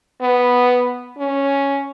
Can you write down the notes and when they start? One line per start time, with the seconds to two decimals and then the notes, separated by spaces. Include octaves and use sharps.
0.22 B3
1.18 C#4